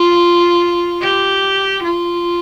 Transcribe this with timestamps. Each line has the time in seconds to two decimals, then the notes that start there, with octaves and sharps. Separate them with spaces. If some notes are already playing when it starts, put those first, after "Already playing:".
Already playing: F4
1.02 G4
1.83 F4